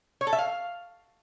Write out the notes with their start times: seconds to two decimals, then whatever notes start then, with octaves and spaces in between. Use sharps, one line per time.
0.21 C#5
0.27 A4
0.33 E5
0.38 F5